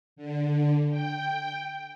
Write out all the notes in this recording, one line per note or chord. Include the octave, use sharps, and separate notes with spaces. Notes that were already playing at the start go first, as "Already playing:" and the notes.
D3
G5